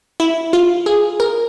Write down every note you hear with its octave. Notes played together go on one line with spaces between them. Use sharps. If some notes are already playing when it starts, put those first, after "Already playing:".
E4
F4
G#4
A#4